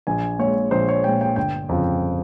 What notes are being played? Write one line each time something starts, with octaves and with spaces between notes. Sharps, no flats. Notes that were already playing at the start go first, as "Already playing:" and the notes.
A#1 G#5
A#2 G#3 C#5
A#1 C5
C#5
A#2 G#3 G5
G5
G1 G5
F2 C#3 F3